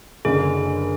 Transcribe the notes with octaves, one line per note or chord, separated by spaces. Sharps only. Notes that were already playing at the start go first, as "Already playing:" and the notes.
F#1 F#2 D3 G#4